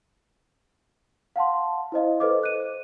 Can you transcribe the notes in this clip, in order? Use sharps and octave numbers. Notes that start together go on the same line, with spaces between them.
F5 F#5 A5 C6
E4 C5 D#5 F5
A4 B4 C5 D#5 D6
F#6 D#7